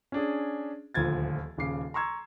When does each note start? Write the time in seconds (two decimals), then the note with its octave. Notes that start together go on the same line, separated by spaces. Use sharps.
0.12 C#4 D4 G#4
0.94 D#1 D2 F3 G#6 A6
1.57 D#1 C#3 D6 C7
1.94 A#5 C6 C#6 E6 G#6